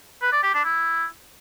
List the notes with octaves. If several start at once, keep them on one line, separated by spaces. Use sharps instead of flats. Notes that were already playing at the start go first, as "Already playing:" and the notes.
B4
D5
G4
D4
E4